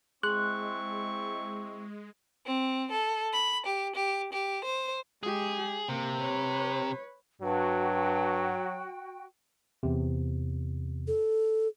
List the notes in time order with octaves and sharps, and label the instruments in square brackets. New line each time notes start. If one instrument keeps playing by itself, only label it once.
[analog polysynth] G#3 [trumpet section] C4 E4 C#6 [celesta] G#4 C6 [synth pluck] F#6
[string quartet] C4
A4
B5
G4
G4
G4
C5
[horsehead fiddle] G#3 G4 [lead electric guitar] G#4
[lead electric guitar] C3 [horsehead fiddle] A#3
[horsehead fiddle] B4 C#5
[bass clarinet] G2 [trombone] F#3 [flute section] F#4 G5
[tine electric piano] E2 C3
[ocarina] A4